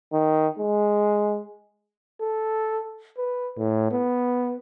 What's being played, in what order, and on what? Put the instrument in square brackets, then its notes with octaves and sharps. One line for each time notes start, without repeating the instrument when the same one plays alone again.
[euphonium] D#3
G#3
[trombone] A4
B4
A2
B3